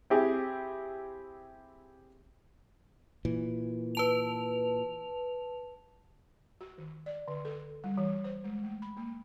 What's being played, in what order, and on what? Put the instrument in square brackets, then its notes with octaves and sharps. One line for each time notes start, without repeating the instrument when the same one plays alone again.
[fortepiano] C4 E4 G4 G#4
[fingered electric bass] A#2 E3
[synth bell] B4 A5 F7
[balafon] F#4
D#3
D5
D3
A4
G3
E3
C5
G#3
A3
B5
A#3